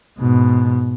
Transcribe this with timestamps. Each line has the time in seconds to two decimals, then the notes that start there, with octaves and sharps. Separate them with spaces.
0.19 G#2 B2